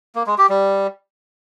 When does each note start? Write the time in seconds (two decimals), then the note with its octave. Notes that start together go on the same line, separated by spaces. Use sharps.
0.15 A#3
0.27 G#3
0.38 G4
0.49 G3